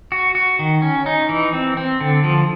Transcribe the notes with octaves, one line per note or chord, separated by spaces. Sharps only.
F#4
F#4
D#3
C#4
D#4
E3
C4
C4
D3
F3